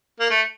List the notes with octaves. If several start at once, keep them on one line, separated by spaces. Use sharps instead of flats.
A#3
A3